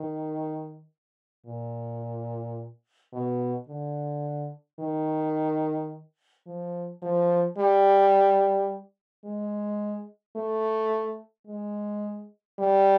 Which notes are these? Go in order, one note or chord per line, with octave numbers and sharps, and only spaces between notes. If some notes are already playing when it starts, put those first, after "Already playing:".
Already playing: D#3
A#2
B2
D3
D#3
F3
F3
G3
G#3
A3
G#3
G3